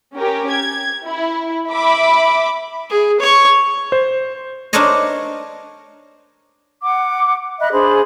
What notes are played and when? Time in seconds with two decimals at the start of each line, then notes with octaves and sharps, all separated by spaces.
0.14 C#4 G4 A#4
0.50 G#6
1.06 E4
1.72 E5 B5 D6
2.90 G#4
3.20 C#5 C#6
3.92 C5
4.73 D4 D#4 A#4 C5 C#5 D#5
6.83 F#5 D6
7.60 D#5 E5 B5 F#6
7.72 D4 G#4 C5 B5